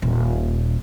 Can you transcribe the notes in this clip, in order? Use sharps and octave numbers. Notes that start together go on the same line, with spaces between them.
D#1 A#2